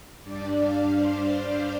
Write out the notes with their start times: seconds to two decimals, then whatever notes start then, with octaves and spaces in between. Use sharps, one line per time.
0.22 G2 G3 D4 D5
0.59 F5
0.95 C5